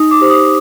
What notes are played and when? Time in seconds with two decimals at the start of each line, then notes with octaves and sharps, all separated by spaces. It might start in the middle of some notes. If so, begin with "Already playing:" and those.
Already playing: D#4 D#6
0.11 D6
0.21 G4 C5
0.30 D#6